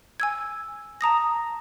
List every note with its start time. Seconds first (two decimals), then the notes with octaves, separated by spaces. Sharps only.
0.20 G#5 E6 G#6
1.01 A5 A#5 D#6 A#6